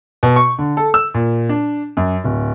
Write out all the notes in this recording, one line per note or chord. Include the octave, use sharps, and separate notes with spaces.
B2
C#6
D3
A4
E6
A#2
D4
F#2
D1